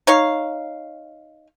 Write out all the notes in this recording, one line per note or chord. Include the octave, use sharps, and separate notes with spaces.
D#4 C#5 F5